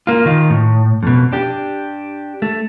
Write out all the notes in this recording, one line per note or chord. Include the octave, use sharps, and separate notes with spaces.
A#3 F4
D#3 F4
A2
F2 B2
D4 G4
A3